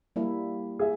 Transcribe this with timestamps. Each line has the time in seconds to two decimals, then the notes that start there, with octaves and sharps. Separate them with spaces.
0.16 G3 A#3 E4
0.79 G#4 E5